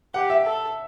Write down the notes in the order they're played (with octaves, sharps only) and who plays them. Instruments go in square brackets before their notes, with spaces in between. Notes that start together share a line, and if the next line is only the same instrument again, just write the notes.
[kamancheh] G4 [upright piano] F#5
[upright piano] E5
[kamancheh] A4